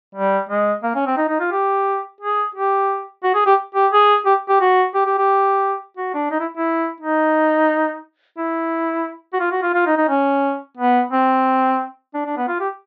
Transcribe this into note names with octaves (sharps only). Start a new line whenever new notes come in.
G3
G#3
A#3
C#4
C4
D#4
D#4
F4
G4
G#4
G4
F#4
G#4
G4
G4
G#4
G4
G4
F#4
G4
G4
G4
F#4
D4
D#4
E4
E4
D#4
E4
F#4
F4
F#4
F4
F4
D#4
D#4
C#4
B3
C4
D4
D4
B3
F4
G4